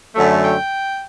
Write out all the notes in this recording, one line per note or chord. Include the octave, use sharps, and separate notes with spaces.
F#2 D3 F#3 A3
G5